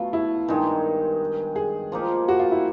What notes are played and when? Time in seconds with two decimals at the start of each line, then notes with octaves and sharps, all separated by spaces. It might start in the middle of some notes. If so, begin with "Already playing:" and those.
Already playing: B2 F#3 A3 F4
0.13 E4
0.48 G2 D#3 G#3 D#4
1.56 G#4
1.92 F3 A#3 D#4 G4
2.28 F#4
2.39 F4
2.51 E4